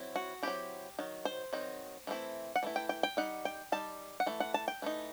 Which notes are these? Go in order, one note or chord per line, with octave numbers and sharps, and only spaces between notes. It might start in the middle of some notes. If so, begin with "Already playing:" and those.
Already playing: F#3 C4 E4
F#4
F#3 C4 E4 G4
D#3 F#3
C5
D#3 F#3 C4 D#4
E3 A3 C4 E4
F#5
E3 A3 E4
G5
G5
G5
G3 D#4 F#5
G5
G3 D#4 A5
F#5
E3 A3
F#5
A5
G5
E3 A3 D#4